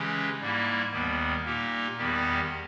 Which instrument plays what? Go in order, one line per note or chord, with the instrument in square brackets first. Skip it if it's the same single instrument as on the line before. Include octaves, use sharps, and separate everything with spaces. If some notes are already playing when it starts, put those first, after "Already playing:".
Already playing: [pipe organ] C#3 E3 G#3 C#4 G4
G#2 G3 A#3 E4
D#2 D#3 G3 B3
A#2 A#3 D#4 G4
E2 D#3 G3 B3 G4